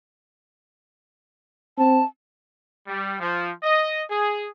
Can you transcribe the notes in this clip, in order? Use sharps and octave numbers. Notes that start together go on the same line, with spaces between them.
C4 A5
G3
F3
D#5
G#4